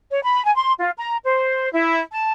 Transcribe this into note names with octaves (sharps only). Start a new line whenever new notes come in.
C#5
B5
G#5
C6
F4
A#5
C5
E4
A5